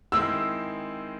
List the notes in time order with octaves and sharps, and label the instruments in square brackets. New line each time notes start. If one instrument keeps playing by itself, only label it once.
[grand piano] D#3 G#3 C4 E4 [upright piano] E6